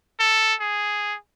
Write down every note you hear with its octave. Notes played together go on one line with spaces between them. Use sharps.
A4
G#4